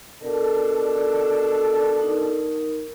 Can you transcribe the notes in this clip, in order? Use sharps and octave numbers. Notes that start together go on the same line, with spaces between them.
B2 D4 A4 A#4
D#4 A#4